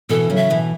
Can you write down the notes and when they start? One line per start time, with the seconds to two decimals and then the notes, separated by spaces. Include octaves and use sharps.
0.09 B2 E3 A4
0.30 C#3 F#3
0.36 E5
0.50 B2 E3